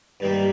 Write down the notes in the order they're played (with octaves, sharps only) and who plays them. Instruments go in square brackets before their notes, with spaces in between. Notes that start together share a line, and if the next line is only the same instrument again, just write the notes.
[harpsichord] G2 D#3 G3 A#3